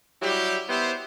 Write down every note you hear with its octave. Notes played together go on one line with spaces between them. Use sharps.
F#3 G3 E4 G4
B3 E4 G4 C5